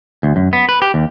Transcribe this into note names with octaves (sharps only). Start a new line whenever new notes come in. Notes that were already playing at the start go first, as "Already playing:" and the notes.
D2
F#2
B3
B4
G4
D#2